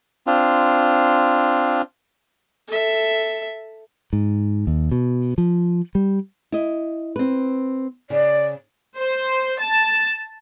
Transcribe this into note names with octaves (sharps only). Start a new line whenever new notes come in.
C4 D4 F4
A4 E5
G#2
D#2
B2
F3
G3
E4 D#5
C4 B4
C#3 D5
C5
A5